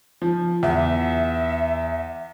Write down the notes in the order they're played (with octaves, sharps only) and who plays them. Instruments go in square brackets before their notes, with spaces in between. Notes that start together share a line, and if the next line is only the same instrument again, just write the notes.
[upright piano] F3
[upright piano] E2 [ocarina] E5